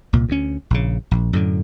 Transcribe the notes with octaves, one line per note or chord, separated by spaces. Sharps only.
C2 A#2
D2 C#4
A#1 C#3
A#1
F#2 A2 D3